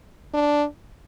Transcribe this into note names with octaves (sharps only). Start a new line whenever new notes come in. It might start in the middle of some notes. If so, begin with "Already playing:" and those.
D4